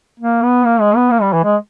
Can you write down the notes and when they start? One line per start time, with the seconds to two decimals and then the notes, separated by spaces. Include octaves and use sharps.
0.20 A#3
0.43 B3
0.66 A#3
0.81 G#3
0.96 B3
1.11 A#3
1.22 G3
1.33 E3
1.44 G#3